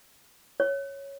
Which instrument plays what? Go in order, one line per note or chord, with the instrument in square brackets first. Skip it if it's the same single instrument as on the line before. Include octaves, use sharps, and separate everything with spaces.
[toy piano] C#5